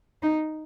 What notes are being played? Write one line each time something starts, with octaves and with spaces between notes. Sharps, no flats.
D#4